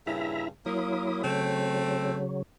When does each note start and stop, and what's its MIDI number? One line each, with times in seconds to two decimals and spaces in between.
0.07 0.49 43
0.07 0.49 46
0.07 0.49 49
0.07 0.48 64
0.07 0.48 76
0.07 0.48 82
0.66 1.23 54
0.66 1.21 58
0.66 1.23 64
0.66 1.23 87
1.24 2.42 49
1.24 2.42 54
1.24 2.21 57
1.24 2.21 60